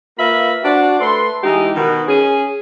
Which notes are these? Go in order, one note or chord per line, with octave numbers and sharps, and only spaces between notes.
A#3 F4 B4 E5 B5
D4 F#4 C5 D5
A3 B4 C6
E3 G#3 D#4 G4 G#4
B2 D#3
C#4 G#4